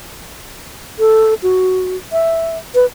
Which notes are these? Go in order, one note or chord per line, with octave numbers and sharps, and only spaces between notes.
A4
F#4
E5
B4